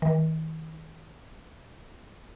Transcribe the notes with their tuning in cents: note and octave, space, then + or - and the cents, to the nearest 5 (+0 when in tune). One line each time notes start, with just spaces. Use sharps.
D#3 +40